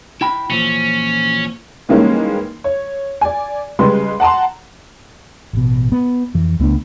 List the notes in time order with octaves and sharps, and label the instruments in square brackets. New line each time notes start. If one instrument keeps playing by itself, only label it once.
[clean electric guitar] E4 G5 B5
[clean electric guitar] A#2 E3 F3 [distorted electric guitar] C#4
[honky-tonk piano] D#3 E3 G3 G#3 A#3 C#4
C#5
D5 G#5
C#3 G3 G#3 B4 C6
F#5 A5 A#5 C6
[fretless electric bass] A1 B2
B3
F2 E3
C#2 A3 B3 D4